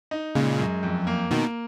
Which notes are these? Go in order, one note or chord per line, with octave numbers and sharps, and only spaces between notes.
D#4
A#2 C#3 G#3
F#2
F2
A#3
B2 D#3 A#3